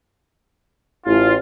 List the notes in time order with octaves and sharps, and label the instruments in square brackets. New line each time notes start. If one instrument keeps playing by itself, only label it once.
[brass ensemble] A1 F4 [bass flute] E4